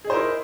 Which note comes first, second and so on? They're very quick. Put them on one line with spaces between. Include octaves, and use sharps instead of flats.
G#4 D#4 C5 A#4 E4